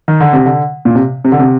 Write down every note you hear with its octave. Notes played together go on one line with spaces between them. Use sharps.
D#3
D3
C3
D3
A#2
C3
C3
D3
C3